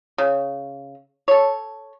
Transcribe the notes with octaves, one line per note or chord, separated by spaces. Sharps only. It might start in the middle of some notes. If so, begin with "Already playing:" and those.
C#3
A4 C#5